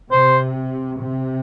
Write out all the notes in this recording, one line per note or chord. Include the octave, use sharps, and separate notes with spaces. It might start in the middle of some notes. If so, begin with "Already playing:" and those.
C3 C5
C3